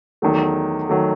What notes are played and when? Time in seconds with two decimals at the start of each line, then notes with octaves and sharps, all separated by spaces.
0.22 E2 D#3 F#3 A3
0.89 D#3 F#3 A3